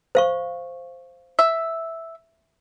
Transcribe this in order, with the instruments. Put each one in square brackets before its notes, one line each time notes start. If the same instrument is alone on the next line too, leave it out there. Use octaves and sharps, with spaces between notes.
[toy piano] C5 F5 C#6
[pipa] E5